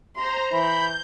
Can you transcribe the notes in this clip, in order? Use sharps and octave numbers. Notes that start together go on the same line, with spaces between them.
C5 A#5 C6
E3 B5 G6